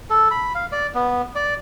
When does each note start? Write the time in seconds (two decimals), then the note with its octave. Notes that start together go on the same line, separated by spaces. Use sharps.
0.10 A4
0.31 B5
0.55 F5
0.72 D5
0.95 B3
1.35 D5